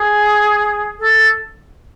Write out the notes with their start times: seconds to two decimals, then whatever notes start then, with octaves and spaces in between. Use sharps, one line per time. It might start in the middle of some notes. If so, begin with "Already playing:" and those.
Already playing: G#4
0.99 A4